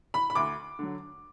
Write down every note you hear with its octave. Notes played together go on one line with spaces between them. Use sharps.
B5
B5
D2 D6
D3 F#3